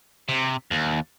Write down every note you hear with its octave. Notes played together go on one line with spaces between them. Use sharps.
C3
D#2